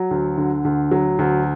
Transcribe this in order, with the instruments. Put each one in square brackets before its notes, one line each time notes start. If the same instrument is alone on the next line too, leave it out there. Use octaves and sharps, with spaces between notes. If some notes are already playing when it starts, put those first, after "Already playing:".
Already playing: [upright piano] F#3
D2
D3
D2
F#3
D2